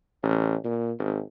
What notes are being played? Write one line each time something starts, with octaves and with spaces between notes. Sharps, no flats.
A1
A#2
G#1